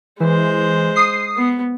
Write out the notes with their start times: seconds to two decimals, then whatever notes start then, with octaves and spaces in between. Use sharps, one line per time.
0.20 E3 G#3 C5
0.96 D#6 C7
1.37 B3